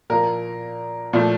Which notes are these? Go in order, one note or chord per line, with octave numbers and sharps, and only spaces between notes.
A#2 F3 A#3 A#4
A#2 F3 A3